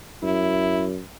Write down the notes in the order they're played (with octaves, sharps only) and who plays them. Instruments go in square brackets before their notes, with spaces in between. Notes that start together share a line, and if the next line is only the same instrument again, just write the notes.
[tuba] F#2 [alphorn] E4